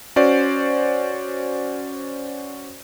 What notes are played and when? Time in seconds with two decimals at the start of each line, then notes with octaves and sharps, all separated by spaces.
0.16 C#4 F#4 C5 D5